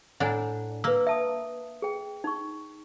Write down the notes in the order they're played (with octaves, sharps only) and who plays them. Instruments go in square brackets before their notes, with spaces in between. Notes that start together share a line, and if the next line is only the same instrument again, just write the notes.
[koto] A2 D4 [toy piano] F#5 G#5 A#5
[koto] A#3 [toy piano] B4 E6
[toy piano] E5 A5 D#6
G#4 G5
D#4 C#6